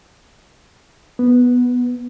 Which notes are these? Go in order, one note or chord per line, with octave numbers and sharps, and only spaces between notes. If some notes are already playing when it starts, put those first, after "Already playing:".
B3